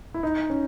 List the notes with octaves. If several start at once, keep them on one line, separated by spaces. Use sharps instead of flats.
E4
D#4
C#4